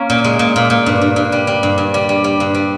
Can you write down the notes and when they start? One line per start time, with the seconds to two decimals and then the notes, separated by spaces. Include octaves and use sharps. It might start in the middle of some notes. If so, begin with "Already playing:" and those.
Already playing: A#3 C#4
0.10 A#2
0.24 G#3
0.39 A#2
0.56 A#2
0.70 A#2
0.86 G2
1.01 G2
1.16 G2
1.32 G3
1.47 G3
1.63 G2
1.78 G2
1.94 G3
2.09 G3
2.24 G3
2.40 G2
2.55 G3